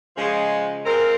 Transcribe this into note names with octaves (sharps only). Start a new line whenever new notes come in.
C#3 F3 G#3
G#3 C4 F4 A#4